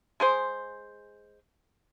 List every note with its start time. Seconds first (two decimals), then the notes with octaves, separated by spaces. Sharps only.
0.20 G#3 G#4 C5